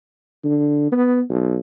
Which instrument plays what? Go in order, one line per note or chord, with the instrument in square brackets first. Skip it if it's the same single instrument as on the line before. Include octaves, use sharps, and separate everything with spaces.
[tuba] D3
B3
B1